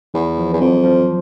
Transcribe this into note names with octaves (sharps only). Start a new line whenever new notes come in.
E2 E3
F3
E2
F2 F#3
F3